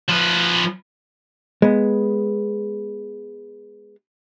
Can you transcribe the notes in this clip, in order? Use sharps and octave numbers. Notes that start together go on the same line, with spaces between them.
F3 B4
G#3 B3